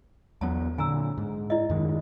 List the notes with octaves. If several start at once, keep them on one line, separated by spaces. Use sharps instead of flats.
E2 F#3 B3 A5
A#2 D3 G#5 A#5 E6
G#2
E4 D5 D#5
F#2 D#3 G#3